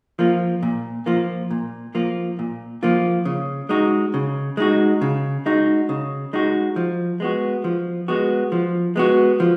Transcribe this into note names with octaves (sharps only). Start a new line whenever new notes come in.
F3 A#3 F4
A#2
F3 A#3 F4
A#2
F3 A#3 F4
A#2
F3 A#3 F4
C#3
G#3 D#4 F#4
C#3
G#3 D#4 F#4
C#3
G#3 D#4 F#4
C#3
G#3 D#4 F#4
F3
G#3 B3 F#4
F3
G#3 B3 F#4
F3
G#3 B3 F#4
F3